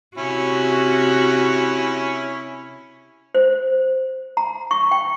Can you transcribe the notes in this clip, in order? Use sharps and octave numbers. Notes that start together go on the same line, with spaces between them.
C3 C#4 E4 F#4
C5
A#5
C#6
G5